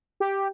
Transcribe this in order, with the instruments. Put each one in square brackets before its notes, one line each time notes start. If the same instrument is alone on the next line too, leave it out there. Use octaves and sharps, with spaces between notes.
[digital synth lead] G4